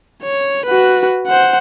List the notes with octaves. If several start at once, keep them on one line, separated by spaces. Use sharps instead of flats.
C#5
F#4 B4
C5 F#5